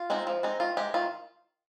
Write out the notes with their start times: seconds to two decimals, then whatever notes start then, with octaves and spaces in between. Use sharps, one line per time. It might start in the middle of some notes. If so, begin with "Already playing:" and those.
Already playing: F4
0.10 G#3 C4 D#4
0.27 F3
0.43 G#3 C4 D#4
0.60 D#3 F4
0.77 G#3 D#4 G4
0.94 D#3 F4